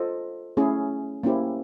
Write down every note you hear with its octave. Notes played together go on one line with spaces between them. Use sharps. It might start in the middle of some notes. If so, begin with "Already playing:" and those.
Already playing: F4 A4 C5 D#5
A3 C#4 E4 G#4
A#3 C#4 E4 G4 C5